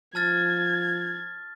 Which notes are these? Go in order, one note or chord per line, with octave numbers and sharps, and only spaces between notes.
F3 A5 F6 G#6 A6